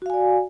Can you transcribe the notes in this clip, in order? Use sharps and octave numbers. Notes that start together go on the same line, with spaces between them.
F#4 D5 F5 G#5